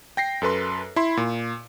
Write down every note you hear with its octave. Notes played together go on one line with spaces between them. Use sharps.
G5 A#6 C7
F#2 A4 B4 C6
E4 B5 C6
A#2